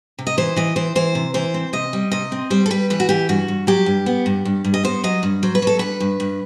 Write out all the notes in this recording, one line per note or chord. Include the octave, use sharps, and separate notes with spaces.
C3
D#5
E3 C5
E3 D#5
E3 C5
E3 C5
C3
E3 C5
C4
C3 D#5
G3
C3 D#5
C4
G3 C5
A4
G3 B4
E3 B4
F#4
E3 G4
G2 F#4
G2
F#3 G4
G2
B3
G2
G2
G2
D#5
B3 C5
F#3 D#5
G2
F#3 C5
B4
F#3 A4
G2 B4
G2
G2